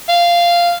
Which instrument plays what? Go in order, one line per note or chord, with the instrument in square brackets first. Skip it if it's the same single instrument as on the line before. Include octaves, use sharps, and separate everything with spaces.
[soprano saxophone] F5